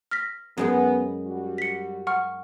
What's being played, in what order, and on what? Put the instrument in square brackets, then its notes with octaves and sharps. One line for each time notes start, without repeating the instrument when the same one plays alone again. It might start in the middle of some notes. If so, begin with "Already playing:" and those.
[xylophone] F6 A#6 B6
[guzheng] F#2 G#3 D#4 [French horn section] B3
[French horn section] G3 F#4
[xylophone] B6 C#7
F#5 C#6 F6